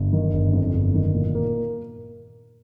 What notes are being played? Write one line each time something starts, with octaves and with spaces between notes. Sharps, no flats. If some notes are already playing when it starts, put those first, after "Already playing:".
Already playing: G1
D#3
G1
F2
G1
D#3
A#2
A#3